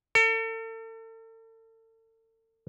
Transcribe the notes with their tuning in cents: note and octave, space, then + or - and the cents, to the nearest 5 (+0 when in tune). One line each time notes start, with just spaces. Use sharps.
A4 +40